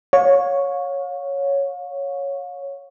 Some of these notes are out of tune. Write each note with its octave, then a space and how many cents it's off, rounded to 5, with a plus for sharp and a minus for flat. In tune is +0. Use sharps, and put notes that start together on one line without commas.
C#5 +0 F5 +40